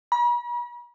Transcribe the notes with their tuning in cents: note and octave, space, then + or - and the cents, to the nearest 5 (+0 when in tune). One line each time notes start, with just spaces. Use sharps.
B5 -45